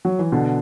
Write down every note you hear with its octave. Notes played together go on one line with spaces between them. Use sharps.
F#3
E3
B2 D3